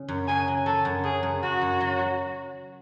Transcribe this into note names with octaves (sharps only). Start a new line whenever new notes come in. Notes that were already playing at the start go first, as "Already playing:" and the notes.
Already playing: C#3
F#2
C#3 G#5
F#3
F#3 A4
F#2
C#3 G#4
F#2
F#2 F#4
F#2
F#3
F#3